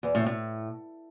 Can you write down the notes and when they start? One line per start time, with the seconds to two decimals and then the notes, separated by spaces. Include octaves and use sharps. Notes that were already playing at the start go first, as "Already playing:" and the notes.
0.03 E2
0.15 A2
0.26 A2